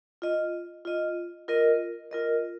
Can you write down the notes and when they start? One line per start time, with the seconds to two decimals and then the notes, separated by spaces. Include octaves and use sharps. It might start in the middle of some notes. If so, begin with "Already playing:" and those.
0.22 F4 D#5
0.85 F4 D#5
1.48 F4 A#4 D#5
2.11 F4 A#4 D#5